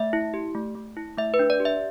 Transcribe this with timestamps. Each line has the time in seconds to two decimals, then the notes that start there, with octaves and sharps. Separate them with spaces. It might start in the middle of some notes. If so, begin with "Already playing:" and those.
Already playing: A3 E5
0.13 E4
0.34 G4
0.55 A3
0.75 A3
0.97 E4
1.18 A3 E5
1.34 B4
1.39 D4
1.50 D5
1.60 G4
1.65 E5